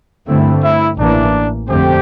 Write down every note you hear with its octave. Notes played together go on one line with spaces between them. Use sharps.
G2 D3 A3 C4 E4
E4
A1 A2 E3 A#3 D4
F2 D3 A3 C4 G4